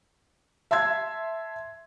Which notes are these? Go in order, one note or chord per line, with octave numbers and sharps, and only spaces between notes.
E5 A5 C6 E6 G#6